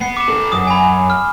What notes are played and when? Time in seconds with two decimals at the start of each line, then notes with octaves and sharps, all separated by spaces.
0.01 B3 C7
0.17 D6 E7
0.29 A4 B4
0.52 F#2 D#6
0.67 G#5 B5
1.10 F6